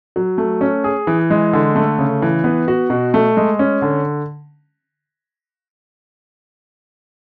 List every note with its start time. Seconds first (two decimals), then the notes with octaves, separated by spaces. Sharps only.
0.16 F#3
0.38 A3
0.61 C#4
0.84 G#4
1.07 E3
1.30 G#3
1.53 D3
1.76 A3
1.99 C#3
2.22 E3
2.44 B3
2.68 F#4
2.90 B2
3.14 A3
3.37 G#3
3.59 C#4
3.82 D3